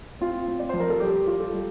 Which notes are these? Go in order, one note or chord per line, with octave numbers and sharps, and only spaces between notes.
C4 F4
C4
D5
F3 C5
A#4
A4
G3 G4
F4
A4
G3